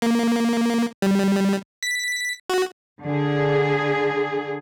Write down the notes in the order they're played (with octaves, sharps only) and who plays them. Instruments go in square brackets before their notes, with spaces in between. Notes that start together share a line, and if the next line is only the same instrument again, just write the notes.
[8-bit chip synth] A#3
G3
B6
F#4
[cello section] D3 G#4